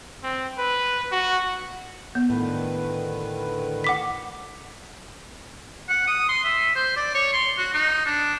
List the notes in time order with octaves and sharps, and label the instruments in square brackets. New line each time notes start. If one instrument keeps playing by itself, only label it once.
[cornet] C4
B4
F#4
[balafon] B3
[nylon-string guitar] A2 [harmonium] D3 D#3 B4
[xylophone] F#5 D6 B6
[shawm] F#5
D#6
C6
E5
C5
D5
C#5
C6
F#4
D#4
D4